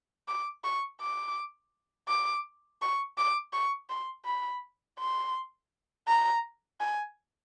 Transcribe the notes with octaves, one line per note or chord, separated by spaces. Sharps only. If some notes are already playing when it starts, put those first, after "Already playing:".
D6
C#6
D6
D6
C#6
D6
C#6
C6
B5
C6
A#5
G#5